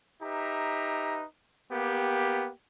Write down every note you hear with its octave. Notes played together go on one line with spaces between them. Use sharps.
D#4 G4 B4 E5 A#5
A#3 B3 G4